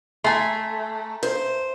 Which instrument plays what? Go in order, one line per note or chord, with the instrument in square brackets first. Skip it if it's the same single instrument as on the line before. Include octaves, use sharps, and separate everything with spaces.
[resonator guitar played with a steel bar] A3 [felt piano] E5 A#5 [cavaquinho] G#5 C6
[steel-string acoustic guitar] C5